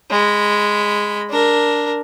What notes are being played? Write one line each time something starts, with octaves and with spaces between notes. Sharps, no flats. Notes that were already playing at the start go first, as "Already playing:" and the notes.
G#3 B5
D4 A#4